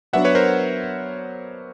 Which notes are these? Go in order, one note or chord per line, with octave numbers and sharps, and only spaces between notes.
F#3 B3 D4 F#4 E5 F#5
B4 C#5
A#4 C5